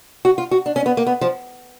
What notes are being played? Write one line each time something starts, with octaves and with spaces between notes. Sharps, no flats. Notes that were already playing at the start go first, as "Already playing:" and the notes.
F#4
F4
F#4
D4
C#4
B3
A#3
B3
F3